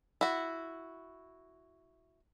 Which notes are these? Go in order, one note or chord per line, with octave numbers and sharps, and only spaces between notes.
E4 F#4